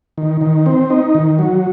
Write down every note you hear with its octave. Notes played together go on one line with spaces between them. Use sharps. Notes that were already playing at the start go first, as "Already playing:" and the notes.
D#3
D#3
C4
D#4
D#3
F#3